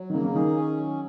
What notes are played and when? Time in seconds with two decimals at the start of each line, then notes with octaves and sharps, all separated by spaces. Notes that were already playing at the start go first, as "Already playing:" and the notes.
Already playing: F#3
0.10 D#3
0.13 C#3 A#3
0.24 C#3
0.34 D#3 G#4
0.56 C#4
0.77 F#3